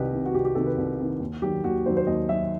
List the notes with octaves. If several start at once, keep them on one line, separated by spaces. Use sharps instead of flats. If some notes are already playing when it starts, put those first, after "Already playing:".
Already playing: C2 C3 D#3 G4 B4 D#5
C3 D#3
F#4
C2 G4
G4
C3 D#3 A4
B4
C2
C3 D#3
D#2
D#3 F#3 G4
D#2 F#4
D#3 F#3 C5
C5
D#2 D#5
D#3 F#3 E5